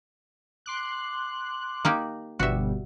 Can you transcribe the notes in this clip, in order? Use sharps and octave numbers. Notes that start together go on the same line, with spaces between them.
C6 D6 F#6
A#3 D#4 G4
G1 B2 G3 F#4 E5